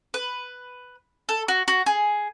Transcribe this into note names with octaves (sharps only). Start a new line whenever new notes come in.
B4
A4
F#4
F#4
G#4